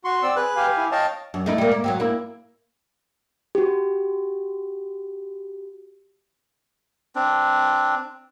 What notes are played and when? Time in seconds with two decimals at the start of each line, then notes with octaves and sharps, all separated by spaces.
0.05 F#4 C6 C#6
0.23 C4 D5 E6
0.36 G#4 B4 F#6
0.56 G4 F5 G#5
0.77 E4
0.92 C#5 D#5 F5 G5 A5
1.34 F#2
1.46 A3 D#4 E4
1.58 G3 A#3
1.71 A#3
1.84 F#3 B3 C4
2.00 A#3 E4
3.55 F#4 G4
7.15 C4 D4